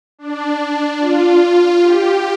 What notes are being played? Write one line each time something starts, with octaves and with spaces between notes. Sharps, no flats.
D4
D4
F4
G4